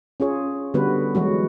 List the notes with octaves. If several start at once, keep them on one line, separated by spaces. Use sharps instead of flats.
C#4 F4 G#4 C#5
D3 G3 B3 F#4 B4
E3 F#3 G#3 F#4